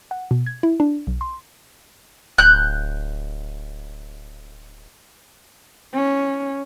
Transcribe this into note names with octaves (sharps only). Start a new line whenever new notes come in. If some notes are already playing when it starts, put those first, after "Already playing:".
F#5
B2
G#6
E4
D4
B1
C6
D1 F#6 G6
C#4